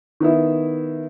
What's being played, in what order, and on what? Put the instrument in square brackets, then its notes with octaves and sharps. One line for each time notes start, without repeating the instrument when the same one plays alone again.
[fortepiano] D#3 B3 E4